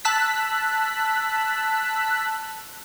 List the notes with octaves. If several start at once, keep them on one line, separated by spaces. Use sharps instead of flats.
A5 E6 F#6 B6